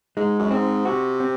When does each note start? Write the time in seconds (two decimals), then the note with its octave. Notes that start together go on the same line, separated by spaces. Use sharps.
0.16 G#2 G#3
0.39 F#2
0.51 G#2 C4
0.85 C3 F#4
1.20 C4